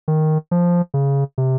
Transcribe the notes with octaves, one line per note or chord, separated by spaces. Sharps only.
D#3
F3
C#3
C3